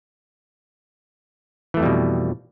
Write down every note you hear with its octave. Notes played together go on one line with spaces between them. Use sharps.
F2 B2 E3 G3 A3